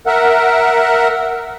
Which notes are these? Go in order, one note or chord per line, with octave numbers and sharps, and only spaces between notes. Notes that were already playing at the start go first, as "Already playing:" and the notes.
A#4 E5 F#5